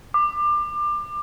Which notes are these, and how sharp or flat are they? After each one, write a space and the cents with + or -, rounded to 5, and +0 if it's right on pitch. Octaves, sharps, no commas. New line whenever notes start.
D6 +25